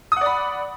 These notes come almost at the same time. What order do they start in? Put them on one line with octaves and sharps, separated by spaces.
D#6 F#5 D5 B5